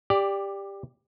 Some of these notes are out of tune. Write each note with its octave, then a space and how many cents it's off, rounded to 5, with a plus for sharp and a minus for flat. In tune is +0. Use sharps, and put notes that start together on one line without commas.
G4 +15 D5 +0